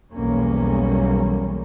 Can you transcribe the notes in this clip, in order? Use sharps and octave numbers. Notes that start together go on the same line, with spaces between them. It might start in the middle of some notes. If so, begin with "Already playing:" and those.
B1 E2 G3 A#3 C#4